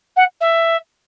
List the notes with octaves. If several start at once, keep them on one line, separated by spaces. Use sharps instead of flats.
F#5
E5